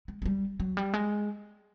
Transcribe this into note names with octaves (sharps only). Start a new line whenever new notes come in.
G#3
G#3
G3
F#3
G3
G#3